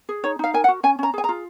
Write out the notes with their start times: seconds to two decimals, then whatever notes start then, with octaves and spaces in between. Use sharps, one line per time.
0.09 G#4
0.24 D#4 C#5
0.39 D#4 F5
0.54 A#4 G#5
0.64 F#5
0.68 F#4
0.83 C#4 G#5
0.99 C#4 A#5
1.14 G#4 G#5
1.24 A#5
1.29 F4